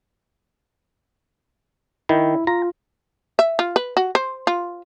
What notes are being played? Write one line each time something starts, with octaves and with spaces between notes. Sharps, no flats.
D#3 E4
F4 A#5
E5
F4
B4
F#4
C5
F4